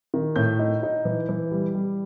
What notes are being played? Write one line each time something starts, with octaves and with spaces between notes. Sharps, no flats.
D#3
A2 G6
D#4
D#4
E3
E3
G3
G3